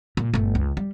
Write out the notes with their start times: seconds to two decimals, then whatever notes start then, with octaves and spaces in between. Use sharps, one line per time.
0.17 A#2
0.34 G1 A3
0.55 C#2
0.77 G3